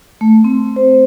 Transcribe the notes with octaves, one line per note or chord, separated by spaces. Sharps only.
A3
C4
C5